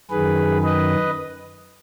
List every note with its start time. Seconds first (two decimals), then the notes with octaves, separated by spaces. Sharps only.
0.11 F#2 D#3 G#4 B4
0.63 B4 D#5